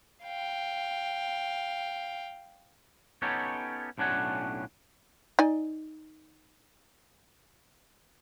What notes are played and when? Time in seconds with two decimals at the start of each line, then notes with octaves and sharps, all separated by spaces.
0.23 F5 G5
3.22 B3 C#4 D#4 G4 A4 C#5
3.98 B1 A2 C#4 D4 F#5 G#5
5.39 D#4 D5 G#5